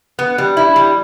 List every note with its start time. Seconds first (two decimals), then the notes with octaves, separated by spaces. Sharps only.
0.19 B3
0.38 G3
0.57 E4
0.76 G3